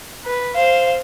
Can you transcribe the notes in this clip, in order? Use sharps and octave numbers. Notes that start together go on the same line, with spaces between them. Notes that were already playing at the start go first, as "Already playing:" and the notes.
B4
C5 F5